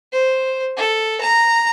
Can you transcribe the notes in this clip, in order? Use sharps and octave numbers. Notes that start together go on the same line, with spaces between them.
C5
A4
A#5